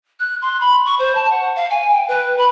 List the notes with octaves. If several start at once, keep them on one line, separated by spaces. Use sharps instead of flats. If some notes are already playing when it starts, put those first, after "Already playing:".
F#6
C6
B5
C#6
C5
A5
F#5
F5
G#5
G5
B4
B5